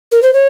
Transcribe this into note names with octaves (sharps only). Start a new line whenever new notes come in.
A#4
C5
C#5